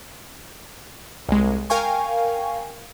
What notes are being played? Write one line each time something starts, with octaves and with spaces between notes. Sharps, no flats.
C2 G#3
A#4 F5 G5 G#5 C#6